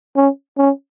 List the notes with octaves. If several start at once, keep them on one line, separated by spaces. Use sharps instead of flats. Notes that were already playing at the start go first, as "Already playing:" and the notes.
C#4
C#4